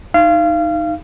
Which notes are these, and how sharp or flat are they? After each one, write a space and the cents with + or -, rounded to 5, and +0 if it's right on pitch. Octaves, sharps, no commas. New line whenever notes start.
D#4 +0 F5 -25